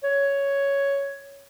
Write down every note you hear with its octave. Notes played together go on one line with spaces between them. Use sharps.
C#5